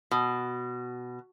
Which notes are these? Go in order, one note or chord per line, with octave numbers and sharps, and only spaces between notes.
B2